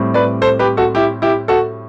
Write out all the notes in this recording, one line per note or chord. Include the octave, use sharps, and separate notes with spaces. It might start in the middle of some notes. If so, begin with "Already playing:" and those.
Already playing: A2 G3 C4
B4 D5
A4 C5
G4 B4
F#4 A4
E4 G4
E4 G4
F#4 A4